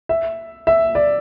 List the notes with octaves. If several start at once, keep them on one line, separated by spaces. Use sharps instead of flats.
E5
E5
D5